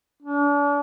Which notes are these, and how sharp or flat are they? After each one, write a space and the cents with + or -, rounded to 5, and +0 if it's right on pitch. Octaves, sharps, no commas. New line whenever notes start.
D4 -40